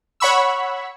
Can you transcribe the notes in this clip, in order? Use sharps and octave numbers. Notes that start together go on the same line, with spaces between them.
C#5 F#5 B5 C#6 E6